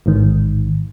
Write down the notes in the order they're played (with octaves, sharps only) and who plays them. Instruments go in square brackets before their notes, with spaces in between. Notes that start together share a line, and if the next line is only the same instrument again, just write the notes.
[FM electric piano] A1 G#2 D#3